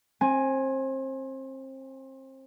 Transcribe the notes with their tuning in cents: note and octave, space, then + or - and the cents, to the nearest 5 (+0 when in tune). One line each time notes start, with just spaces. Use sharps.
C4 +30 G#5 +0